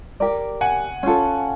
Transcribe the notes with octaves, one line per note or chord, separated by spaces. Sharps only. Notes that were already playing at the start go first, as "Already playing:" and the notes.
G4 A#4 D5
F#5 G#5
C#4 F4 A4